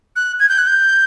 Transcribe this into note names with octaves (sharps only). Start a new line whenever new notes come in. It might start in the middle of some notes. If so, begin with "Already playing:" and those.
F#6
G#6
G6
F#6
G6